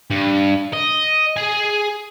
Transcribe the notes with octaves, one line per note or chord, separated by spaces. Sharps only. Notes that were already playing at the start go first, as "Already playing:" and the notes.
G2
D#5
G#4 G#5